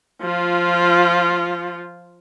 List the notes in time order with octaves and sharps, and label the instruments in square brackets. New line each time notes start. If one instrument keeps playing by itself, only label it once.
[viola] F3 F4